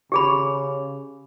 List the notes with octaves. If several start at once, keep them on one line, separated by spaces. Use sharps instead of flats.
C#3 G4 G#4 B5